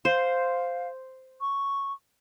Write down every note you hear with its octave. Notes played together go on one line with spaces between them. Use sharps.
C5 F5
C#6